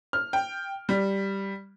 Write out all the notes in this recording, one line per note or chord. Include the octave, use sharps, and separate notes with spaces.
F6
G5
G3